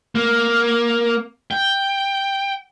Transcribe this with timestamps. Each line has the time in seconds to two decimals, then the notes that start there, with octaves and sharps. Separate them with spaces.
0.15 A#3
1.51 G5